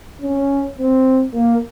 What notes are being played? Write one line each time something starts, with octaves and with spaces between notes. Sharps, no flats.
C#4
C4
A#3